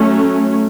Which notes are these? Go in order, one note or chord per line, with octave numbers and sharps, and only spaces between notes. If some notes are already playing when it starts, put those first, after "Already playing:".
Already playing: F#3 A3 C#4